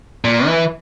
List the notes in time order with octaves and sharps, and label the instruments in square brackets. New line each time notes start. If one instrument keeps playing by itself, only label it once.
[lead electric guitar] A#2
E3